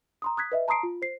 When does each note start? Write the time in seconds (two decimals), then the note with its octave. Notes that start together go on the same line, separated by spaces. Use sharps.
0.22 A#5 C6 D#6
0.37 D#6 F#6 G#6 B6
0.52 B4 D#5 E5
0.68 A5 A#5 C6 D#6 C7 D7
0.83 F4
1.02 C5 C7